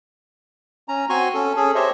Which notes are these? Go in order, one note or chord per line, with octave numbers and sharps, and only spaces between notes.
C#4 A#5
C4 F#4 G#5 C6 C#6
C#4 A4
C#4 G#4 A4
G4 C5 C#5 D#5 E5